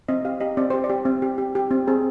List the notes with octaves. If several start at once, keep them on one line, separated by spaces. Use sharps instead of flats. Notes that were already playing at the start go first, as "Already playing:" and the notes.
C4 D#5
G4 F5
G4 D#5
C4 D5
G4 C5
D5
G4
C4
G4
G4
G4
C4
C4 G#4